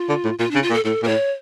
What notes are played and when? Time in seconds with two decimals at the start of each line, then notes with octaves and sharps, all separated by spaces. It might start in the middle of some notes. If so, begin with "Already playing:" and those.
Already playing: F4
0.09 D3
0.25 A2
0.39 A#2 F4
0.51 C#3 D4
0.62 F4
0.70 A#2
0.74 A4
0.85 A2 A4
1.02 A#2 A#4
1.07 A2 C#5